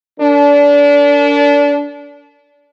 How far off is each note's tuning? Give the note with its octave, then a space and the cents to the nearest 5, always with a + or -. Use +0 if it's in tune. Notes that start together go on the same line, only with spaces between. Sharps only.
D4 -30 A#4 -30